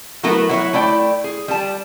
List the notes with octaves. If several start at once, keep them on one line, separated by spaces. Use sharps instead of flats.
F#3 A3 B3 E4 F#4 A#4
F#3 E4 C#5 D5 E5 F#5
A3 E4 D5 G5
G#4
G3 A5